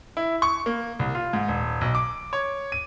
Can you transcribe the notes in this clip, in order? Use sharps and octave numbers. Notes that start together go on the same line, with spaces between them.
E4
C#6
A#3
C2
F4
G#2
D#1
B1
D6
C#5
D#7